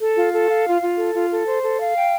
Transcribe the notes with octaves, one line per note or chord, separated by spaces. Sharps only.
A4
F4
A4
F5
F4
F4
A4
F4
A4
C5
A4
F5
G5